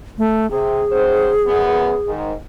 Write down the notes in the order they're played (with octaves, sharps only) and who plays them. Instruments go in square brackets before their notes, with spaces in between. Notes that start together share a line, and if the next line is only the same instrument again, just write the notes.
[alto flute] A3
[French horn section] C3 [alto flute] G#4
[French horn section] F#3 C4 C5
F#2 B3
G#2 D#3